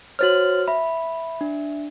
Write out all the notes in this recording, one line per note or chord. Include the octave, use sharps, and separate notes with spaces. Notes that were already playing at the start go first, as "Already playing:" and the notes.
F#4 C5 C#5 F6 A6 F#7
E5 B5
D4